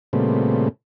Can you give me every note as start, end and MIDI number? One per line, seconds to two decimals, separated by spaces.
0.13 0.69 46
0.13 0.69 49
0.13 0.69 55
0.13 0.69 57
0.13 0.69 59
0.13 0.69 60